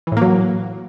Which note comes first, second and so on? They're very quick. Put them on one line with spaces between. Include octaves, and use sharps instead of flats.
E3 A2 A#3 F#3